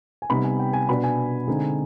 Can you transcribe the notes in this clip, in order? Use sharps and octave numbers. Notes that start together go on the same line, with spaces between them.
G#5
C3 G3 B3 D#4 B5
G#5
G5
G#5
B2 B3 D4 B5
G#5
D3 G#3 C4 D#4